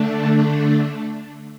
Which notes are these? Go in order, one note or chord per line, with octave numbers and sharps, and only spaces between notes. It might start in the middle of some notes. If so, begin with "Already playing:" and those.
Already playing: D3 A3 D4